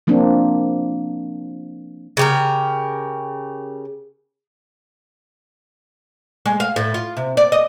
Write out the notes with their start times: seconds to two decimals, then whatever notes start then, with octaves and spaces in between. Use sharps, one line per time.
0.07 F3 A#3 C4 D4
2.17 C#3 G4 A#4
6.46 G#3
6.60 F5
6.76 A2
6.94 F4
7.17 C3
7.37 D5
7.52 D#5